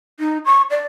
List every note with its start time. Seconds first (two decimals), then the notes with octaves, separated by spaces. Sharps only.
0.20 D#4
0.45 C#6
0.70 D5